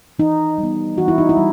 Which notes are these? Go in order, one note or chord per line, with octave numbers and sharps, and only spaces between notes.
E3 D#4
G3
B3
E3 F#4
E4
D#4
E4
G3